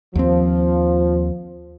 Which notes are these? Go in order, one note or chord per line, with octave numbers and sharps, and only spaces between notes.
D#2 F3 C4